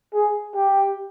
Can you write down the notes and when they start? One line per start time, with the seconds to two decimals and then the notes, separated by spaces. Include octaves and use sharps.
0.14 G#4
0.55 G4